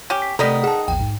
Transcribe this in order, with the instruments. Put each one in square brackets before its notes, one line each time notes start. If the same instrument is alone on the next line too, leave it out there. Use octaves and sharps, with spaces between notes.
[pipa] C#4 G4
[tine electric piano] B6
[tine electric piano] C3 A3 [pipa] D#3 B3 D#4 [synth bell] A4 D5 B6
[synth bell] G#4 A5 [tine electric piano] F#5
[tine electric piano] A#1 E2 [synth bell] G5
[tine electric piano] G#2